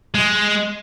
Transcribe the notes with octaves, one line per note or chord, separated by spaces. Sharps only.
G#3